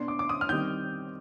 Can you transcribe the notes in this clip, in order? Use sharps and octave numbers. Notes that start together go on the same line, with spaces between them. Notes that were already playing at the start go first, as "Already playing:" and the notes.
Already playing: B2 B3 D4 C6
D6
D6
D#6
F6
D#3 G3 C4 G6